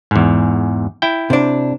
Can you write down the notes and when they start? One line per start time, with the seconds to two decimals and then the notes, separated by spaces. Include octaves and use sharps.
0.11 E2 G#2
1.02 E4 G5
1.30 C3 D4